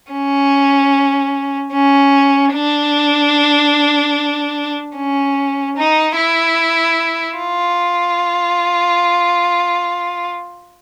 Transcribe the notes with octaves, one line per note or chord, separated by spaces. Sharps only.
C#4
C#4
D4
C#4
D#4
E4
F4